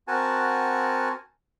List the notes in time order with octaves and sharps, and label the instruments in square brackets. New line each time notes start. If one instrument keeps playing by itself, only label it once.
[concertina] C4 F#4 A#4 F#5 G#5 A5